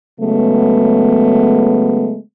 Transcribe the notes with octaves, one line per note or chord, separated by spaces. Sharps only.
C#3 F#3 G#3 A3 B3